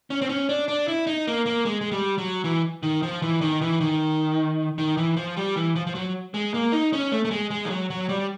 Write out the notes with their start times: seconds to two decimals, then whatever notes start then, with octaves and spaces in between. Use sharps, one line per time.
0.10 C#4
0.21 C4
0.29 C#4
0.49 D4
0.68 D4
0.88 E4
1.07 D#4
1.27 A#3
1.46 A#3
1.65 G#3
1.81 G#3
1.91 G3
2.18 F#3
2.44 E3
2.83 D#3
3.02 F3
3.22 E3
3.41 D#3
3.61 E3
3.81 D#3
4.78 D#3
4.97 E3
5.16 F3
5.37 G3
5.56 E3
5.76 F3
5.87 F3
5.95 F#3
6.34 G#3
6.54 A#3
6.72 D#4
6.93 C#4
7.12 A3
7.25 A3
7.31 G#3
7.50 G#3
7.65 F3
7.70 F#3
7.90 F#3
8.09 G3